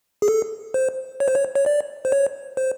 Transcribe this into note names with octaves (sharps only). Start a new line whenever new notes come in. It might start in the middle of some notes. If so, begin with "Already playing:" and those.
G#4
A4
C5
C#5
C5
C#5
C#5
D5
C5
C#5
C5